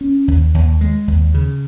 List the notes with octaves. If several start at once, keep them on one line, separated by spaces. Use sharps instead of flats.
C#4
D#2
D#2
G#3
D#2
C#3